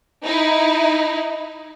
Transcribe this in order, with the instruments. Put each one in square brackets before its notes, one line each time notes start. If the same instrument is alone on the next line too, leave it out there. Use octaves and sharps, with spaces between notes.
[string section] D#4 E4